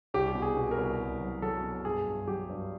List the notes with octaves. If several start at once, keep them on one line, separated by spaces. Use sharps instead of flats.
C2 G4
B2
G#4
B2
A#4
C2
C2
F#3
F#3 A4
B2
G2 G#4
G2
F#3 G4
G2